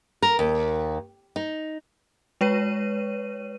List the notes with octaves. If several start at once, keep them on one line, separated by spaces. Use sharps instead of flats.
A#4
D#2
D#4
G#3 B4 C#5 D#7